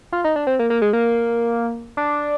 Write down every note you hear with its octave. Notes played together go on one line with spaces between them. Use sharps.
F4
D#4
D4
C4
A#3
A#3
G#3
A#3
D4